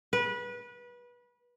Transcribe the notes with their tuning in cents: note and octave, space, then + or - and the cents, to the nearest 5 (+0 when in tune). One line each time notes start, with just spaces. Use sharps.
B4 -25